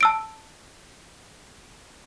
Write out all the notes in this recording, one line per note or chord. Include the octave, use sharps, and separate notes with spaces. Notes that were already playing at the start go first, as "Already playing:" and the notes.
A5 E6 D7